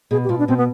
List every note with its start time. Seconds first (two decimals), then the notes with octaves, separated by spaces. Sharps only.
0.11 B2 G#4
0.24 G4
0.29 B2 F4
0.39 D4
0.48 B2 C4
0.58 B3